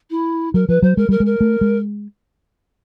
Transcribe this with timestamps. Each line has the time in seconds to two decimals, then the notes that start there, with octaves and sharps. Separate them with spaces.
0.10 E4
0.54 F#3 A#4
0.68 F3 B4
0.82 F#3 C5
0.97 G#3 A#4
1.09 G3 A#4
1.20 G#3
1.26 A#4
1.41 A3
1.61 G#3